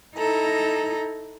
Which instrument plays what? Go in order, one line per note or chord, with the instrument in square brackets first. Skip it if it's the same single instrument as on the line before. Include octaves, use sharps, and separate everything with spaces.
[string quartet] D#4 E4 A4 A#5